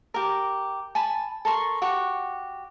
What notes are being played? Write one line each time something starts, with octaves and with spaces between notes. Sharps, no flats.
G4 A#4
G#5 A5 B5
A4 A#4 C6 C#6
F#4 G4 C#6